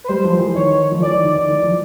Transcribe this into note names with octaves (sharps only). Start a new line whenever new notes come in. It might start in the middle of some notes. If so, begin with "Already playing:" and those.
B4
G3 C5
F3
E3
D#3 C#5
F3
E3 D5
D#3
D#3
D#3
E3
F3